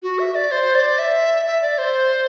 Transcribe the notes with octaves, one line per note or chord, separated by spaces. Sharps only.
F#4
E5
D5
C5
D5
E5
E5
D5
C5